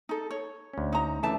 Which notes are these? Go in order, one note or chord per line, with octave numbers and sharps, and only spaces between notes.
D#4 A4
C#5
D2 C#4
D#4 A#5
C#3 E3 A3 D4 E5 A5